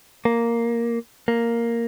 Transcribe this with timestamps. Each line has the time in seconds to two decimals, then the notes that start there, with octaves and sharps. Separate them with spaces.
0.25 A#3
1.28 A#3